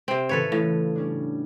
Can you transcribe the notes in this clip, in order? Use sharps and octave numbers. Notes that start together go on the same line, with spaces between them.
C3 C4
A2 C#3 E3 A4 B4 C#5
A2 F4
G3 C#4 D4